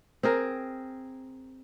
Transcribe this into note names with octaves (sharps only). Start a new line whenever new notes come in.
C4 G#4 A#4